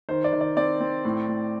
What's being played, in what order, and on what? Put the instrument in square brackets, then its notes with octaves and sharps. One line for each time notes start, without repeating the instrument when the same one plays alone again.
[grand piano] D#3 C5
D5
D#3
D5
C4 D5
C4
A2
A2